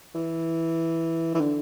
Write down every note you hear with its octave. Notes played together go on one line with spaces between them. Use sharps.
E3
E3
D3